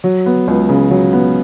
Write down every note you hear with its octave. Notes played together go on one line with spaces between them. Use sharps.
F#3
B3
C#2
C#3
F#3
B3